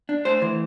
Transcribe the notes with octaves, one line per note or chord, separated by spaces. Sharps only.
D4
A3 C5
E3